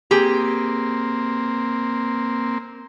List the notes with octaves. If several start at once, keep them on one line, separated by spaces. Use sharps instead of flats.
A#3 C4 G4 G#4